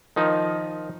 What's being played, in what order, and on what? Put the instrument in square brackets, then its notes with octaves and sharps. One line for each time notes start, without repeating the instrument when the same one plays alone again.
[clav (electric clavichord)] D#3 F3 D#4